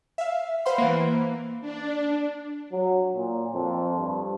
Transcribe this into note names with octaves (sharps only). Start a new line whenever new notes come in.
E5 F5
B4 C5 F5 F#5 B5 C6
E3 A#3
D4
F#3
A#2
F2
G2